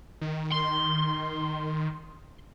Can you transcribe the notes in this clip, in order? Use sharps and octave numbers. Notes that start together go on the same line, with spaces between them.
D#3
C6